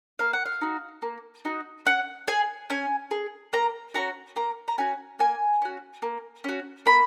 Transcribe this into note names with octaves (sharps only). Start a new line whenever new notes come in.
A#3 F5
F#5
F5
D#4 F#4
A#3
D#4 F#4
C#4 F#5
G#4 G#5
C#4 G#5
G#4
A#3 A#5
C#4 F#4 A#5
A#3 A#5
A#5
C#4 F#4 G#5
A#3 G#5
C#4 F#4
A#3
C#4 F#4
A#3 B5